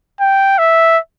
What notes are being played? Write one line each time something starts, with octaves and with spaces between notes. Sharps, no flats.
G5
E5